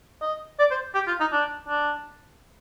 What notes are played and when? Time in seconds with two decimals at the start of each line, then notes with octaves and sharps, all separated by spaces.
0.21 D#5
0.59 D5
0.71 C5
0.95 G4
1.07 F4
1.20 D#4
1.32 D4
1.68 D4